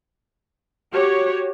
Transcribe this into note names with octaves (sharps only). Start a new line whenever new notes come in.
F#4 G4 C#5